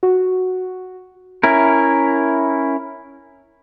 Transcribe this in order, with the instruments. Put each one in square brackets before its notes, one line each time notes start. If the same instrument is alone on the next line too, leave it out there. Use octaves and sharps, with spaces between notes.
[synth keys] F#4
[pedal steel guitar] C#4 E4 A#4